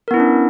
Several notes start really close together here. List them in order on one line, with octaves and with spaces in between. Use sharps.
A#4 B3 E4 C#4 D4